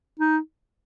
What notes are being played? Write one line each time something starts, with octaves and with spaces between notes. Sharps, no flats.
D#4